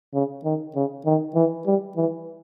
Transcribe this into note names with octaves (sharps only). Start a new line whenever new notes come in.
C#3
D#3
C#3
D#3
E3
G3
E3